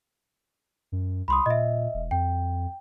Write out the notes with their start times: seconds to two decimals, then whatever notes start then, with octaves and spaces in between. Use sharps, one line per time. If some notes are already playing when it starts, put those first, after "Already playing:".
0.92 F#2
1.28 C2 B5 C6 D#6
1.46 A#2 D#5 E5
1.94 E1
2.11 F2 G5